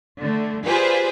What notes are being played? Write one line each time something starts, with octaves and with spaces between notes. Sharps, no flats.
D3 A3
F4 G4 G#4 B4 C5 D5